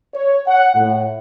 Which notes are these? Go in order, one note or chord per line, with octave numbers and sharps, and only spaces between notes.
C#5
F#5
A2